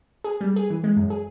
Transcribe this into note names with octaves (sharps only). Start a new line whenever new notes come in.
G#4
G3
G#4
E3
G#3
F#2
G#4